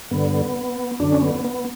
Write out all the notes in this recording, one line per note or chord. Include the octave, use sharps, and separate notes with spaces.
G2 D3 B3
F#2 D3 D4
C#4
B3
B3